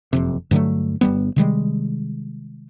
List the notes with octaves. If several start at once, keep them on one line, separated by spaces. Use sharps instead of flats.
F#1 F2 C3
G2 D3 F#3 A3
G1 G3 B3
C3 D#3 G3 G#3